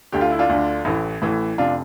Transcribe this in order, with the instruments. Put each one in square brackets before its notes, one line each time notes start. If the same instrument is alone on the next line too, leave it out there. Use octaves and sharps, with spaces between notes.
[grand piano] D2 D3 G4
F4
E4
D4 F4
D2 D3
A1 A2 E3
A1 A2 E3
F1 C3 D4 F4